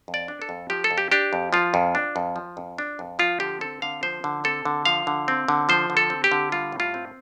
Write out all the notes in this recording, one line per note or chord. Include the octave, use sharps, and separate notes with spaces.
F2
D5
D4
A4
F2
F3 G4
A4
F2
G4
D4 G4
F2
F3 F4
F2
D4
F2
F3
F2
D4
F2
F3 F4
D3 G4
C4 A4
D3 F5
F3 C5
D3
C4 A4
D3
F3 F5
D3
C4
D3
F3 C5
D3
A4
C4
G4
D3
G3 F4
A2
F4
C4